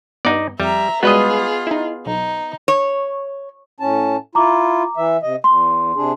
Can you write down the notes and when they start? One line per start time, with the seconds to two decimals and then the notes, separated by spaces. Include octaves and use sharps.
0.25 G2 B3 D#4 D5
0.60 F2 G3 E5 A#5
1.03 G3 G#3 B3 F4 F#4 G#4 B4 D#5
1.67 D#4 E4
2.06 B1 D#4
2.68 C#5
3.80 A2 C#4 A5
4.35 E4 F4 A#5 D6
4.97 E3 E5
5.23 C3 D#5
5.44 E2 C6
5.95 C3 D4 G#4